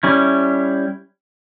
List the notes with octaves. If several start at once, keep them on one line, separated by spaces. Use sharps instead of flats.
G3 C#4 E4